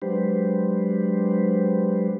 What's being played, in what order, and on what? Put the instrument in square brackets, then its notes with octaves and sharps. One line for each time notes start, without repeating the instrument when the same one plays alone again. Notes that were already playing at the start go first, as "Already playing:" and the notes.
[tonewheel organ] F#3 G#3 D4 G4 B4 C5